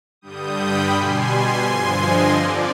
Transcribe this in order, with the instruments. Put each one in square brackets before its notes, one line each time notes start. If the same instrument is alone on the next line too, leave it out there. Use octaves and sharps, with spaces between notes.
[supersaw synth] G2 D3 G3 D#6 G6
G5 B5
B2 G3 G#5 C6
G#5 C6
G2 D3 F3 G#5 C6
D#5
F2 D3 F3 D5